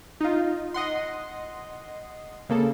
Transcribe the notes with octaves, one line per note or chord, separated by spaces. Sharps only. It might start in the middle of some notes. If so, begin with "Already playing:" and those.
D#4 F4
D#5 F#5 C6
C#3 A#3 A4